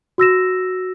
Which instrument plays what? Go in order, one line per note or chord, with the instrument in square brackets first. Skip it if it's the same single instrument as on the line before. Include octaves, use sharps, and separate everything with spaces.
[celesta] F#4 E6 A#6 E7